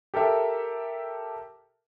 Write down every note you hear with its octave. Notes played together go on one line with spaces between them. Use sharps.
G4 A4 A#4 E5